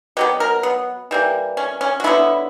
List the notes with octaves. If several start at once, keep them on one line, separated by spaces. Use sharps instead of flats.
B2 F#3 B3 G4
A#4
B3
E3 G3 A#3
C#4
C#4
F#4
D3 F#3 B3 E4